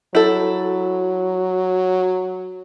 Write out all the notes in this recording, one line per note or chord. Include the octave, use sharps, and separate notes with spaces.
F#3 E4 A4